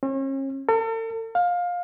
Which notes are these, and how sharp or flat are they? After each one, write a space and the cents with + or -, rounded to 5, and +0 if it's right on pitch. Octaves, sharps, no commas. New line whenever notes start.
C#4 -40
A4 +45
F5 +20